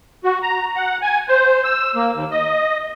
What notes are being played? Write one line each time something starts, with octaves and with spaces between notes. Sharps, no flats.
F#4
A#5
F#5
G#5
C5
E6
A#3
D#2
D#5